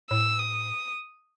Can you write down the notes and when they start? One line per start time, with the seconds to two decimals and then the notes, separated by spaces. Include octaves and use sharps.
0.10 A2 E6
0.39 D#6